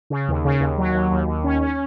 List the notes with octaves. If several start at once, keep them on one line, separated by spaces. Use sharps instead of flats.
C#3
D#2
C#3
D#2
F#3
D#2
D#2
D#2
C#4
C#4